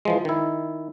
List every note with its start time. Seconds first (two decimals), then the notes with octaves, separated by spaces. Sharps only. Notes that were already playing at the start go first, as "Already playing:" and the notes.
0.05 E3 F3 G#3
0.25 D#3 E4